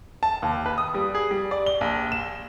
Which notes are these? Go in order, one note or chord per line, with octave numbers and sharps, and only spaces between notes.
A5
D#2
B4
D#6
G3
G#4
G3
D5
G7
A#1
E7